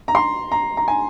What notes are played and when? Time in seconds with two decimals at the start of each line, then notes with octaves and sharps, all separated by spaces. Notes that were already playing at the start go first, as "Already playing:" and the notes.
0.08 A#5
0.15 C6
0.52 A#5
0.77 A#5
0.88 G#5